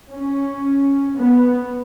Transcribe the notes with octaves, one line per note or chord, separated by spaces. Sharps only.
C#4
B3